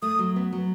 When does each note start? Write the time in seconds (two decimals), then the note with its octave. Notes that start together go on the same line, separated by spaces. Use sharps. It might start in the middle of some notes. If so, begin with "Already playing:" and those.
0.02 A3 D#6
0.19 F#3
0.36 B3
0.53 F#3